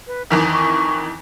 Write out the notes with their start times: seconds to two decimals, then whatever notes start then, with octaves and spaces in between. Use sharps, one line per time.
0.07 B4
0.30 F2 D#3 E3 G#5
0.52 C#6